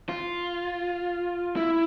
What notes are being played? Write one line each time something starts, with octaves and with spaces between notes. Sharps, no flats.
F4
E4